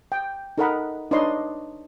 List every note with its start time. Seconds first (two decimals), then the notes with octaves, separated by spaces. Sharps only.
0.12 G5
0.58 D#4 A4 A#4 D#5 F#5 B5
1.11 D4 D#4 B4 C#5 D#5 C6